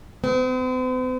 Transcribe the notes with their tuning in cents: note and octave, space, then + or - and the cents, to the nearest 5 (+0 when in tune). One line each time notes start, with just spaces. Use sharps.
C4 -45